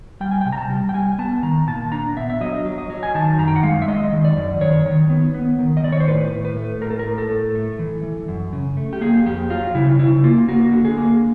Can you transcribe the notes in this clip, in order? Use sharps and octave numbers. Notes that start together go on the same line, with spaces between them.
G3 G5
G#5
C3 G5
A#5
A5
G3
G5
G3 G#5
B3 A5
D#3 A#5
A#2 A5
D4 A#5
B3 E5
E5
F#3 D#5
F#3
D#5
F#3
G#5
D#3 A5
F#2 A#5
G5
F#5
G#3 F5
E5
G#3 D#5
D#3
D5
F#2
D#3 C#5
D#3
B3
B3
D#3
D#5
D#3 D5
C#5
C5
A2 B4
A2
B4
A3
A2 A#4
A4
A#4
A2
A4
A2
A3
E3
E3
F#2
C#3
A3
G4
A#3 G#4
F2 G4
F#3 F4
C#3 E4
C#3 E4
A#3 F4
A#3 F#4
D3
G#4
A#3